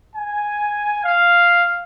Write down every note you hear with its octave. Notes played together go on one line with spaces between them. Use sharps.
G#5
F5